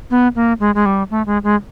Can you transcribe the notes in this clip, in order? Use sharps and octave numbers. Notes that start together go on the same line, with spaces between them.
B3
A#3
G#3
G#3
G3
A3
G#3
G#3